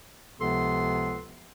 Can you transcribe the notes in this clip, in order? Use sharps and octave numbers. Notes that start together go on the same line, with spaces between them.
C#2 C3 F3 B3 A4 C6